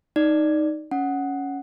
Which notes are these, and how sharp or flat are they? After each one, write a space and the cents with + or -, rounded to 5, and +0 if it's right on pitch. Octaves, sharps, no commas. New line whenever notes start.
D#4 +0 D5 +0
C#4 +5 F#5 +0